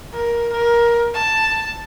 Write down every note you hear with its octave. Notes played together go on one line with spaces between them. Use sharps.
A#4
A#4
A5